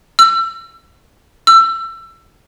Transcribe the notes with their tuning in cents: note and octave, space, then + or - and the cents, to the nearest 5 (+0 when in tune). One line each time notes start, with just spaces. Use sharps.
E6 +30
E6 +25